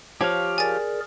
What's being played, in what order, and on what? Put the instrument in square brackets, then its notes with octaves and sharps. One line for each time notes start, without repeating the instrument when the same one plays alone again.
[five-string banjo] F3 C#5 [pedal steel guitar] G4 F5
[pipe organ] G#4 A#4 D5 [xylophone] G#5 A6